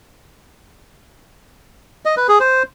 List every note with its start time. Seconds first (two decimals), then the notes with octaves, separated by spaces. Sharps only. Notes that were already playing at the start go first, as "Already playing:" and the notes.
2.05 D#5
2.17 B4
2.28 G#4
2.40 C5